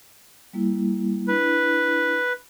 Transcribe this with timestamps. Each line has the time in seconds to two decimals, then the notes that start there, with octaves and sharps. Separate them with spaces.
0.53 G3 A#3 E4
1.28 D4 E4 B4